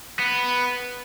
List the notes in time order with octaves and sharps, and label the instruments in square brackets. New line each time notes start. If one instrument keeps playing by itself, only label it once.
[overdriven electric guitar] B3